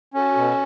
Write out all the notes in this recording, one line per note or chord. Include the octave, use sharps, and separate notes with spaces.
C#4 F#4 A4
B2